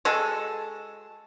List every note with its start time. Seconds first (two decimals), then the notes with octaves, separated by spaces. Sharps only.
0.05 G#3 F#4 G#4 A4